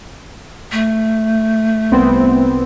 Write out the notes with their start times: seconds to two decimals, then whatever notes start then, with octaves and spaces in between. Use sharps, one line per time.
0.72 A3
1.91 C2 B3 C4